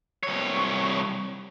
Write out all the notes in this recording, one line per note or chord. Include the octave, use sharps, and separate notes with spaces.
C2 C#5